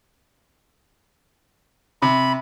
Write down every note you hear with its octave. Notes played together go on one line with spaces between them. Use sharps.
C3 B5